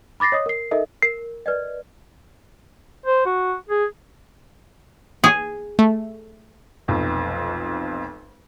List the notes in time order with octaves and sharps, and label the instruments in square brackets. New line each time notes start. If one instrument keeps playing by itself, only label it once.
[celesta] B5 D6 A6 A#6 C7
C#5 D#5 D#6
A#4 C7
D#4 A4 A#4 D#5 E5
[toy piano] A#4 [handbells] C7
[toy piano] B4 D5 D#5
[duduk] C5
F#4
G#4
[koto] G#4
[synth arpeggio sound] A3
[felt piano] F1 B1 F2